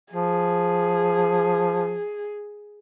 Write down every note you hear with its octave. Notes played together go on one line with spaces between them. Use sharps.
F3 G#4